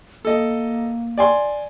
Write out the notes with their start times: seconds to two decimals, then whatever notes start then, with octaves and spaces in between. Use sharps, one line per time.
0.25 A#3 A4 D#5
1.18 D5 G#5 C6